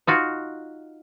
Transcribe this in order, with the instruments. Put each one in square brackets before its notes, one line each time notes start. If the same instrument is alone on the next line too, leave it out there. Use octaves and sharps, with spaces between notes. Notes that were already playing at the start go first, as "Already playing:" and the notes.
[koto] D#4 F4 F#4